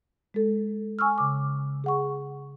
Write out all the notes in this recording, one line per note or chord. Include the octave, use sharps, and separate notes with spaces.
G#3 A4
G#5 C#6 E6 F6
C#3 D6
G#4 F#5 C#6